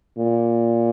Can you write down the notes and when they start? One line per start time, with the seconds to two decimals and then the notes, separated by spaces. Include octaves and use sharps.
0.18 A#2